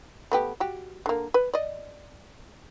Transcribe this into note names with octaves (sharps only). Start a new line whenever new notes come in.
A3 B3 G4
F#4 G4
D3 A#3
B4
D5 D#5